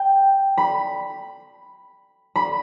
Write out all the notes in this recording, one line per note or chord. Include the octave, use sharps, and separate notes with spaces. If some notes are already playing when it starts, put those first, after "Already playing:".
Already playing: G5
B5
B5